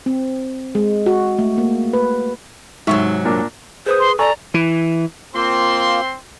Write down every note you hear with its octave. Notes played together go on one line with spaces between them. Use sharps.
C4
G#3
F#4
A3
A#3
B4
G#2 C3 D#3 F#3 E5 C#6
A#2 D4 A#4
G#4 B4 C5 D#6
C6
A4 D5 G#5 A#5 C#6
E3
A#3 C4 F4 C6